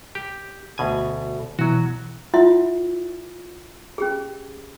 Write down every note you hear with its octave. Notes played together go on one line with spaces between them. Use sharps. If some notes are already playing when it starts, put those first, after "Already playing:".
G4
D2 B2 G#5
B2 E3 F#3 F#4
E4 F4 E5 F#5 C6
C#4 G4 G#4